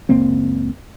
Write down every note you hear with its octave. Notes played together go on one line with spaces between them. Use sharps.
F#1 C#2 A#3 C4